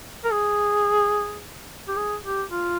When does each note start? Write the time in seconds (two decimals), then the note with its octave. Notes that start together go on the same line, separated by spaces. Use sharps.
0.24 A#4
0.32 G#4
1.88 G4
1.96 G#4
2.24 G4
2.51 F4